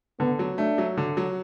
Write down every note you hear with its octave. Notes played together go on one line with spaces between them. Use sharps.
D3 B3
F#3
A3 D4
F#3
D3
F#3